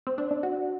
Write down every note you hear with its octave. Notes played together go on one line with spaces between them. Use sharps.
C4
D4
D4
F#4